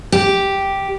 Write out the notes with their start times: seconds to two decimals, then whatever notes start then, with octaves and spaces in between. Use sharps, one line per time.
0.12 G4